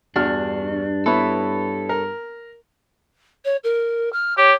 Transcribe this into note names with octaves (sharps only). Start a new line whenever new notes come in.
E2 G2 D4 F#4 F6
B3 E4 A4 C#5
A#4
C#5
A#4
F6
G4 C#5